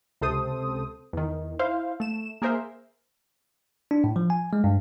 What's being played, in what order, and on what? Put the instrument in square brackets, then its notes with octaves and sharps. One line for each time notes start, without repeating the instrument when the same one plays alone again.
[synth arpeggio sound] C#2 C3 A4 C5 D#6
E2 D#3
E4 C5 F5
A3 E7
A#3 G#4 A#4 C5 E5
[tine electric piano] D4
A2
F3
G#5
G#3
G2